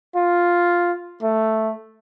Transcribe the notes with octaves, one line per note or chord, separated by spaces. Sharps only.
F4
A3